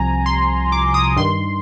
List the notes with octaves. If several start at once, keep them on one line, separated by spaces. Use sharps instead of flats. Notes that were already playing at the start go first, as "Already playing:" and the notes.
Already playing: C2 C3 F3 G#5 A#5
C6
D6
D#6
G2 D#3 C6